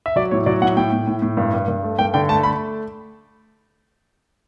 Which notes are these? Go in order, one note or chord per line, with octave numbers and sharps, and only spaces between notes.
E5
F#3 D5
A2 C#5
F#3 D5
A2 F#5
A2 G5
A2
A2
A2
G2
G2
G2
A3
G2 G5
D3 G5
A3 A5
A3 B5